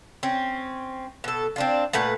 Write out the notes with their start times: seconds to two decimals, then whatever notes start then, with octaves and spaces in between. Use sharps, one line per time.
0.23 C4 C#4
1.24 B2 A4
1.56 C4 D4 F4
1.93 A#2 A3 B4 F#5